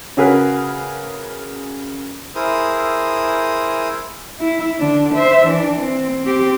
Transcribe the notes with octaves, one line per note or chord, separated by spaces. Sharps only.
C#3 C#4 F#4 G#4 A#4 B4
E4 G#4 A#4 C5 D#6
E4
D3 D4
C5 E5
E3 D4
C4
C4 G4